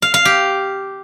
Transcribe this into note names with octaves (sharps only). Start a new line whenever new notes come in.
F5
F5
G4